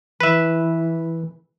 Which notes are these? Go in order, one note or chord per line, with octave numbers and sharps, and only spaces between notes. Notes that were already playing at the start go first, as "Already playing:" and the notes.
E3 B4 E5